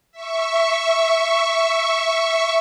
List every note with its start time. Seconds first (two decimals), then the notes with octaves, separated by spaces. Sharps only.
0.12 E5 C#6